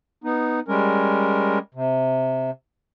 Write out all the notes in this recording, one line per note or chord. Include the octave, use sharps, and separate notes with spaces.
B3 D#4
G3 G#3 C#4 A#4
C3